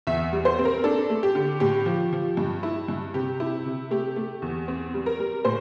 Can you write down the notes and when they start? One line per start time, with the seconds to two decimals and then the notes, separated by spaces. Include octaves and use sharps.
0.07 E2 E5
0.33 G3
0.45 C5
0.59 C4
0.65 A#4
0.84 D4 A4
1.10 A3
1.23 G4
1.35 D3
1.60 A2 G4
1.86 F3
2.13 F3
2.37 G2
2.63 E4
2.88 G2
3.14 C3 G4
3.40 E4
3.66 C3
3.91 A3 G4
4.16 A3
4.42 E2
4.68 C4
4.94 G3
5.06 A#4
5.20 G3
5.45 A2 C5